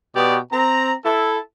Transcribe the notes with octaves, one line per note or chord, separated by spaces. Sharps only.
B2 B3 G4 D5
C4 A#5
E4 A4